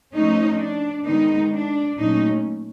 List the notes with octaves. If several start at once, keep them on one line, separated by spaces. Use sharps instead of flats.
F3 A3 C#4 D#4
D4
D#3 G#3 B3 D#4
D4
A#2 F#3 A3 C#4 D#4